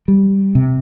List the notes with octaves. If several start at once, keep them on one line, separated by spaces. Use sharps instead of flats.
G3
C3